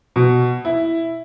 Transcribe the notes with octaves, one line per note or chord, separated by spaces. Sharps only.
B2
E4